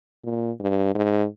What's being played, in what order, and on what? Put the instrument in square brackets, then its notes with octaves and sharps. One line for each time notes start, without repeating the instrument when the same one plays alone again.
[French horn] A#2
G2
G#2